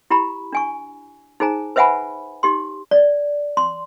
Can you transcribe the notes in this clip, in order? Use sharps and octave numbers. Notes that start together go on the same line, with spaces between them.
E4 G4 A#5 B5
D4 G#5 C#6
D#4 G#4 C5 G#5 A#5
B4 C5 E5 F#5 G#5 B5
D#4 G4 C6
D5
C6